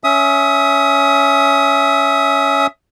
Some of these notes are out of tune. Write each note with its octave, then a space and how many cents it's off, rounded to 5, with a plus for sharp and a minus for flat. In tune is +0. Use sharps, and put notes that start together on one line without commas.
C#4 +15 E5 +0 D#6 +25